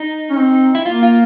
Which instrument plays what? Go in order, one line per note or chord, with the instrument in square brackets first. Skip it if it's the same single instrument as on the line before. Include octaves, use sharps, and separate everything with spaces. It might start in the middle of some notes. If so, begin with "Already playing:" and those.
Already playing: [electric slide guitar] D#4
[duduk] C#4
C4
[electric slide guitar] E4
[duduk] A#3 [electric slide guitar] F4
[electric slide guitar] F4